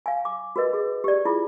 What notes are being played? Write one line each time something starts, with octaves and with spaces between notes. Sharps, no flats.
F5 G#5
D6
F#4 A#4 B4 D#5
G#4
G4 D5
E4 F4 G#4